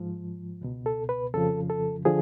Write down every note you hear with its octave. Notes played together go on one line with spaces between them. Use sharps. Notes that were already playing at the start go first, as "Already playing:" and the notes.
Already playing: G#2 F3
C#2 B2
A4
B4
F2 C#3 F3 A4
A4
D3 F3 G#4